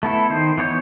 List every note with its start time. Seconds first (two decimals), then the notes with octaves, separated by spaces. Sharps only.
0.03 A3 B3 E4 A4
0.30 D#3 C5
0.58 E3 B3 C#5 G6